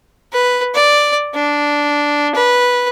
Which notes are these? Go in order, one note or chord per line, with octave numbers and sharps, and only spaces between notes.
B4
D5
D4
B4